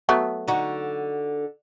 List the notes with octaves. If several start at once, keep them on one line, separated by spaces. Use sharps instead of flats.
F#3 A3 B3
D3 D#4 F#4